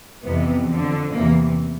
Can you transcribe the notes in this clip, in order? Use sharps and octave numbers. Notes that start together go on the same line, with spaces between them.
F2 C3 E3 B3
F2 D3
E2 C3 E3 A#3